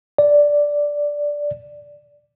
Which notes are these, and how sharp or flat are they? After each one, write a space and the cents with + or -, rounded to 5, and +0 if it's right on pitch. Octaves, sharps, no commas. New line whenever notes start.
D5 -5